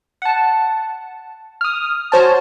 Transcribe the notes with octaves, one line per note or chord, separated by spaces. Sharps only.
F#5 A5
D#6 F6
F#4 C5 C#5 G#5 A5